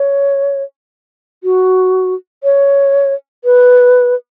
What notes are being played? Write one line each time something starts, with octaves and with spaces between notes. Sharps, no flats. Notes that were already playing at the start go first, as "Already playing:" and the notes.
Already playing: C#5
F#4
C#5
B4